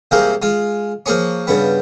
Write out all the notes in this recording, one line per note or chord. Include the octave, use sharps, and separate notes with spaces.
C2 C3 G#3 A#3 C4 F5
G#3 F4
F3 A#3 G#4 C#5
G2 C#3 B3